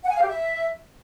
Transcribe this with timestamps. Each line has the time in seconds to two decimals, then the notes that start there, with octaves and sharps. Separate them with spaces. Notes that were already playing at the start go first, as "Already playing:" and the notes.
0.03 F#5
0.09 G#5
0.16 F5
0.22 G4
0.28 E5